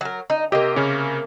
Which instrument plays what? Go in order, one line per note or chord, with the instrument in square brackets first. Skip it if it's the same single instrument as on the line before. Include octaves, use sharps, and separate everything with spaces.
[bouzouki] F#3 A#4
D#4
[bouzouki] C3 A#3 [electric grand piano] G4 D#5
[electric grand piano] C#3 C#4 A#4